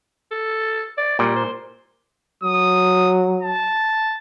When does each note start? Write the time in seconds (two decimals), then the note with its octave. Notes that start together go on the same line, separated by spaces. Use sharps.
0.31 A4
0.97 D5
1.19 A#2 G3
1.36 C5
2.43 F#3 D#6
3.42 A5